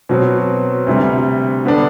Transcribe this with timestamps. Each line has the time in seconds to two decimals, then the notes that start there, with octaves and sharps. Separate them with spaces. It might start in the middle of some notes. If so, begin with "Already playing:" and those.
0.09 B2 F#3 C4
0.87 D2 C3 G3
1.65 D3 G3 B3 D4